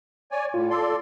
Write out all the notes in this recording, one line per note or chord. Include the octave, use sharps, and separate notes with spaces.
C#5 D5 G#5
A2 F4
A4 D5 C6